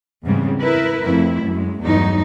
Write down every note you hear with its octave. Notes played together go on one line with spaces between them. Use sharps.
E2 G#2 C#3 G3 G#3 C4
E4 A#4 B4
F2 A3 E4
F#2 G#3
E2 G2 F#3 A3 D#4